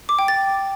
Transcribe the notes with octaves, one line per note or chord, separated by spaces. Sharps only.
D6
G5
A6